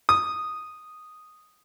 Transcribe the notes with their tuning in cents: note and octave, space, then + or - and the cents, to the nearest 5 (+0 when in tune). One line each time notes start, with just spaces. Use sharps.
D#6 -5